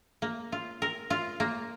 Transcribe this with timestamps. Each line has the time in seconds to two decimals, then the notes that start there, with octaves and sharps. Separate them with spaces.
0.22 A#3
0.52 F4
0.82 A#4
1.10 F4
1.40 A#3